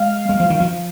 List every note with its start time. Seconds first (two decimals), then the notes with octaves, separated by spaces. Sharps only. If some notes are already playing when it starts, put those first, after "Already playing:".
Already playing: G#3 F5
0.29 G#3
0.40 F3
0.50 D#3
0.60 F3